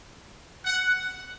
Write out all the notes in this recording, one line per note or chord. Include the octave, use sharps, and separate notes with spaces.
F#5